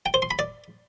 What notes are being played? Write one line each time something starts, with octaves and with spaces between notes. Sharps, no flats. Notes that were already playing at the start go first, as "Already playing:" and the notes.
G5
C5
C6
B5
D5